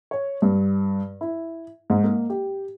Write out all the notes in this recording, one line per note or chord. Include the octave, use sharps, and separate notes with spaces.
C#5
G2
E4
G#2
A#3
G4